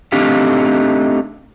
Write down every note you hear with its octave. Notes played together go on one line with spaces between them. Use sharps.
A3 C4 D4 D#4 G4 F5